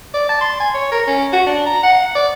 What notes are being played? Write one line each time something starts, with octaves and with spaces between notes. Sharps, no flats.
D5
A5
C6
G#5
C#5
A#4
C#4
F#4
D4
A#5
F#5
D5